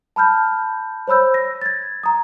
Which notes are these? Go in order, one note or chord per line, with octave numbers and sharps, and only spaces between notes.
A5 B5 F6 G6
C5 C#5 B5 E6 G6
A#6
G#6 A6
A#5 D#6